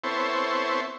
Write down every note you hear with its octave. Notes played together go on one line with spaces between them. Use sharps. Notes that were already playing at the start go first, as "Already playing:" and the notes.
B3 C4 E4 A4 C5 C#5